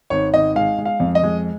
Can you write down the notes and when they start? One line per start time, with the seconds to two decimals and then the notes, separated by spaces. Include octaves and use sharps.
0.10 G#1 C#5
0.34 G#1 D#5
0.56 G#3 F5
0.78 G#3
0.85 F5
1.00 F2
1.15 D#5
1.23 G#3